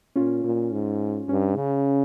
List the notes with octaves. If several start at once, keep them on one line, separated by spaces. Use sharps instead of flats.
A#2 C#4 F4
A#2
G#2
G2 C#4
C#3